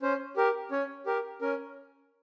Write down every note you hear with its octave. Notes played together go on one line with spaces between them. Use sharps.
C#4 C5
G4 A#4
C#4 C#5
G4 A#4
C#4 A#4